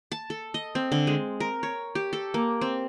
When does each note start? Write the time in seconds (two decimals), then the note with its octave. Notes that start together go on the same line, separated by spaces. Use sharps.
0.12 A5
0.30 A4
0.54 D#5
0.75 C4
0.92 D3
1.07 G#3
1.40 A#4
1.63 C#5
1.95 G4
2.13 A4
2.34 A#3
2.61 C4